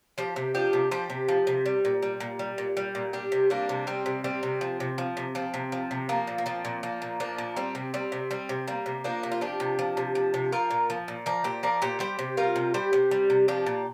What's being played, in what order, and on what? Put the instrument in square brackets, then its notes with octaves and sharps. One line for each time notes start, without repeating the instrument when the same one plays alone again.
[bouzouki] F3 G4 C5
C3
F3 D4 G4
C3
F3 G4 C5
C3
F3
C3
G3
A#2
G3
A#2
G3
A#2
G3
A#2
G3 D4 G4
C3
G3 A#3 D4
C3
G3 C4
C3
G3 C4
C3
F3
C3
F3
C3
F3 C4
C3
F3
C3
F3 A#3
A#2
A#3
F3 C4
A#2
F3 A#3
A#2
F3 A#3 D4
A#2
G3 C4
C3
G3 C4
C3
G3 C4
C3
G3 A#3
C3
F3 A#3 D4
C3
F4
F3 D4 G4
C3
F3
C3
F3
C3
F3 F4 A#4
A#2
F3
A#2
F3 A#4 D5
A#2 G4 C5
F3 A#4 D5
A#2 G4 C5
G3 G4 C5
C3
G3 F4 A#4
C3
G3 G4 C5
C3
G3
C3
F3 D4 G4
A#2